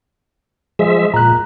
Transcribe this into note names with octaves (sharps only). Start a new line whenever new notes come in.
F3 G#3 G#4 E5
A#2 A#5 F#6